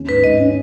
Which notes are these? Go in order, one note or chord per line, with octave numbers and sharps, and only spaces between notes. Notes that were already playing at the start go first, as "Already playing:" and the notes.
Already playing: D#2 C#4
G#2 B4
G#2 D#5
C#4